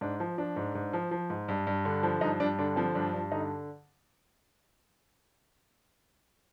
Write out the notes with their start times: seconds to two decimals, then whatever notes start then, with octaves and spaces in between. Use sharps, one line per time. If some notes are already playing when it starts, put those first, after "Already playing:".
0.01 G#2 D4
0.20 F3
0.38 F3 D4
0.56 G#2
0.75 G#2
0.93 F3
1.11 F3
1.30 G#2
1.48 G2
1.67 G2
1.85 D3
2.03 F3
2.21 G2 D#4
2.40 G2 D4
2.59 D3 D4
2.76 F3 C4
2.95 G2 D4
3.13 G2
3.32 D3 D#4